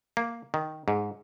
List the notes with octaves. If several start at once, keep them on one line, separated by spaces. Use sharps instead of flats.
A#3
D#3
G#2